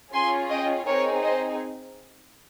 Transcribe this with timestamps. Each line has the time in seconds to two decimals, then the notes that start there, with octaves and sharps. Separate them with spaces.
0.13 C#4 F4 G#4 G#5 C6
0.50 D#5 G5
0.86 C4 D#4 G#4 A#4 C#5
1.23 C5 D#5